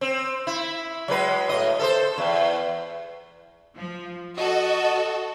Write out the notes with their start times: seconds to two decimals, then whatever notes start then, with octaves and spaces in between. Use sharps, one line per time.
0.01 C4
0.47 E4
1.08 F#3 G#3 B4
1.49 A2 D#5
1.79 A4 A#4 C5
2.18 E2
3.76 F3
4.38 F#4 A4 D#5